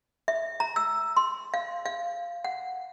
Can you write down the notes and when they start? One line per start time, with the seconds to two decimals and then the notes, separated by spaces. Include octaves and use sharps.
0.28 E5
0.60 A#5
0.76 E6
1.17 C6
1.54 F5
1.86 F5
2.44 F#5